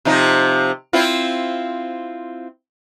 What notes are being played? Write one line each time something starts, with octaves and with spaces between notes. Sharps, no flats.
C3 F3 D#4
C4 E4 F4